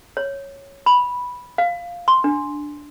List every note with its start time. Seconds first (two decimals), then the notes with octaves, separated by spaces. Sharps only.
0.17 C#5
0.86 B5
1.58 F5
2.08 C6
2.24 D4